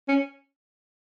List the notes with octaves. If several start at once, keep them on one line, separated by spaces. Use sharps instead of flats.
C#4